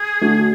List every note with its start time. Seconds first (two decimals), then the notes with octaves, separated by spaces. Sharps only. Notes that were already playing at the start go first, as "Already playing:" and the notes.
Already playing: G#4
0.22 D3 A3 D4 F#4